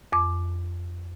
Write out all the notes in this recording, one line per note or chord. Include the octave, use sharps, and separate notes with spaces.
F2 D6